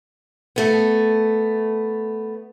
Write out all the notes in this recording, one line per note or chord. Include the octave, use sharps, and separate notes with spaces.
A3 B3